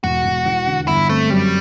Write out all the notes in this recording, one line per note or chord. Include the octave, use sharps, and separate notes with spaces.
E1 F#4
E1
E2
D3
G1 E4
A3 C4
F#2 G3